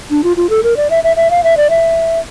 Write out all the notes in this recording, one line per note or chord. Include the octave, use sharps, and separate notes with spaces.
D4
F4
F4
A4
A#4
D5
E5
E5
E5
F5
E5
D5
E5